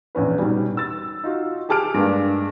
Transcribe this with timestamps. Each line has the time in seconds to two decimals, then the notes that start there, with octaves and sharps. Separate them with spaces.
0.15 A#1 E2 C#4 B4
0.39 G#2 B2 G3
0.77 E6 A6
1.24 D#4 F4 F#4
1.69 G4 G#4 A5 D6 F6 D7
1.94 G2 G#3 A#3 D4